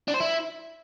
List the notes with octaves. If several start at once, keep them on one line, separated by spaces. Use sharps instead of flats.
D4
C5
E4